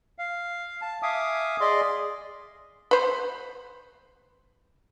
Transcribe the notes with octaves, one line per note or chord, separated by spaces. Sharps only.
F5
A5
E5 F5 G#5 D6 D#6
G#4 D5 D#5 C6
B4 C5